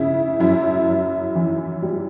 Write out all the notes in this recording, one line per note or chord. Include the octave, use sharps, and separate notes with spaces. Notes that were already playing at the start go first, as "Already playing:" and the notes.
Already playing: C#3 E4
F#2 E4
F#2
E3
G3